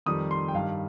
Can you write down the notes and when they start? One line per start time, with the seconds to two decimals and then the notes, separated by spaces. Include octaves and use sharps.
0.06 F2 D#3 G3 D#6
0.31 C6
0.48 G5
0.54 G2 D#3 G3 F5